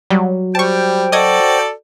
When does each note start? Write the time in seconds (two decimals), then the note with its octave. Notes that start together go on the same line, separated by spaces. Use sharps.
0.10 F#3 G3
0.55 G3 C5 G5 A5 C#6
1.12 F#4 A4 D5 D#5 D#6 G#6